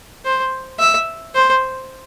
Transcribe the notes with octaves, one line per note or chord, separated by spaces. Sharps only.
C5
E5
C5